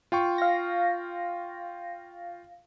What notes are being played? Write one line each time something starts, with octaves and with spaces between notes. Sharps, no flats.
F4 G5 C#6
F5 A#6